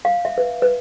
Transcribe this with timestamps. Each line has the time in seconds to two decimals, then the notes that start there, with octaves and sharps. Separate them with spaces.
0.05 F5
0.25 E5
0.38 B4
0.62 B4